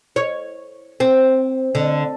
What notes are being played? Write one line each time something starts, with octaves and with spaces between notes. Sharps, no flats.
C#5
C4
D3